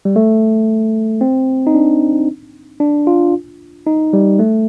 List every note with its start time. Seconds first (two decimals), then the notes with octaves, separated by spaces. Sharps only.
0.05 G3
0.16 A3
1.21 C4
1.67 D#4
1.75 D4
2.80 D4
3.07 F4
3.87 D#4
4.13 G3
4.39 A3